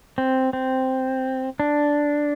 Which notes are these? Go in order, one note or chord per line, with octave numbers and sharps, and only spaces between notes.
C4
C4
D4